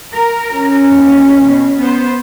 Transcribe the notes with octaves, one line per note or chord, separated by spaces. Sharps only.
A#4
C#4
D#2
B2
B3 C5